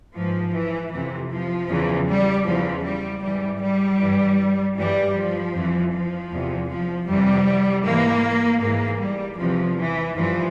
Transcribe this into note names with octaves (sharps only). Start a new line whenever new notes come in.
G#2 E3 F3
E3
F2 C3 E3
F3
E2 C#3 E3
G3
E2 C#3 E3 F3
G3
G#2 E3 G3
G3
G2 E3
G2 E3 G3
F3
F2 E3
F3
E2 C3 E3
F3
F2 C3 E3 G3
G#2 E3 A#3
G#2 E3 A#3
G3
E2 C3 E3 F3
E3
G2 E3 F3